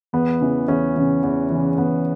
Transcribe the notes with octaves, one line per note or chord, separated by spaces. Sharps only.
E2 B3
C#3 E3
E2 C#4
C#3 E3
E2
C#3 E3
E2 B3